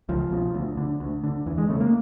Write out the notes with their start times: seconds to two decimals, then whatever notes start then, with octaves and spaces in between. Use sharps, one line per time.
0.09 C#2 F3
0.31 B2
0.54 D2
0.77 D3
1.00 D2
1.24 D3
1.46 E2 E3
1.58 G#3
1.68 C#3 A3
1.80 A#3